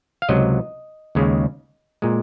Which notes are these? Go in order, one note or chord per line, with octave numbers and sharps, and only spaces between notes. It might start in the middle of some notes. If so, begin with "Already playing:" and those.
F5
C#2 C3 F#3 D#5
D#2 C#3 G#3
A#2 G#3